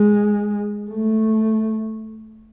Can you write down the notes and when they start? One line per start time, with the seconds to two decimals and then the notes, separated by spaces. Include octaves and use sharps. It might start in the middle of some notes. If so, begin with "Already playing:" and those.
Already playing: G#3
0.90 A3